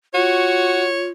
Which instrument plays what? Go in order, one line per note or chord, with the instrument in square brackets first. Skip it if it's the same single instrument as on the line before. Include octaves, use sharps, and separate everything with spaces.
[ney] F4 [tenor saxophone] F#4 [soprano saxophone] C#5